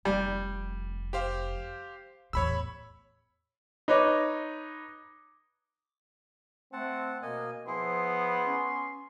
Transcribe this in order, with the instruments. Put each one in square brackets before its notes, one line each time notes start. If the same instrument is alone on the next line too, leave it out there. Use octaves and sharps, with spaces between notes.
[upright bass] F1 [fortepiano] G3
[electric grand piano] G4 C5 F5
[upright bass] E2 A2 [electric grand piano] C#5 B5 E6
[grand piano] D#4 B4 C#5 D#5 D6
[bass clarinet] A3 [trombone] C4 [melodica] F#5 A5
[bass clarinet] B2 [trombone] A#3 [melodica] D#5 G#5
[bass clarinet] F3 [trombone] B3 [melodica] E4 G#4 [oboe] C6
[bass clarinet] C#4